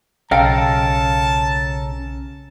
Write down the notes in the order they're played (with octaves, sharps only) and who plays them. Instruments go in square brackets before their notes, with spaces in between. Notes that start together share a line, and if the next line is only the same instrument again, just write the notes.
[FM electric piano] B1 [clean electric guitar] C#3 A4 A#4 [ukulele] F5 G5 [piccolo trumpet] A5